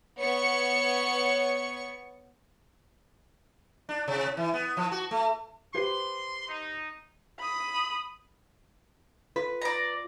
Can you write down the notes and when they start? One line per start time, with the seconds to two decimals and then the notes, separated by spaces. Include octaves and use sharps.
0.19 B3 C#5 C#6 C#7
3.89 D4
4.08 C3
4.37 E3
4.54 B3
4.77 F3
4.91 F#4
5.11 A3
5.75 G4 B4 C5 C6
6.49 D#4
7.39 B5 D#6
9.36 F4 B4
9.62 D5 A#5